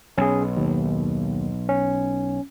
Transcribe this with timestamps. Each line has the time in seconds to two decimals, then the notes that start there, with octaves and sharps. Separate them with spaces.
0.18 B1 C#4 G#4
0.57 D#2
1.69 C#4